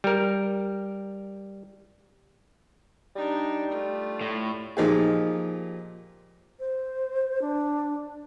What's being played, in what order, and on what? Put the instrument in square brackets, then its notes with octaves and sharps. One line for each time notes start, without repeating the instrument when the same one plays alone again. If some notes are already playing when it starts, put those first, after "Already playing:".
[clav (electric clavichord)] G3 A#4
[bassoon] G3 [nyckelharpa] D4 D#4
[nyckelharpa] A3 F4
[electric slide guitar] A2
[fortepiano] A#2 F3 D#4 G4 G#4
[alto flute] C5
D4